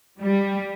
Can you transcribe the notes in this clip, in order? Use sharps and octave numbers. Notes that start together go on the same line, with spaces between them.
G3